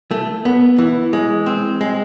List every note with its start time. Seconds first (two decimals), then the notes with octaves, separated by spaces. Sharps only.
0.11 A3
0.45 B3
0.78 E3
1.13 G#3
1.46 C4
1.81 G#3